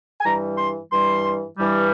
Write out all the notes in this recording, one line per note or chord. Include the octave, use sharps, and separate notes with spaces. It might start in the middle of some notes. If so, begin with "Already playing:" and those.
G#5
G2 E3 G3 A#5
C6
G2 E3 G3 C6
G2 E3 G3